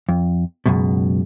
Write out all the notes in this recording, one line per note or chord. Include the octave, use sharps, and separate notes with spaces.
F2
C#2 F#2 B2